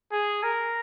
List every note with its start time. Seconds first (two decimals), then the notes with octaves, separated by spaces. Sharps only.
0.12 G#4
0.43 A#4